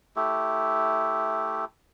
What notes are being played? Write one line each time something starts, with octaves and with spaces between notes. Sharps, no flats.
A3 E4 G4